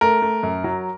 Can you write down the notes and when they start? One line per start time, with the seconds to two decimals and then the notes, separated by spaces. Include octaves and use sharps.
0.01 A3 A#4
0.22 A3
0.43 F#2
0.64 F#3